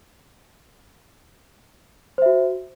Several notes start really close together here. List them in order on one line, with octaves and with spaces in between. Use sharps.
C5 E5 F#4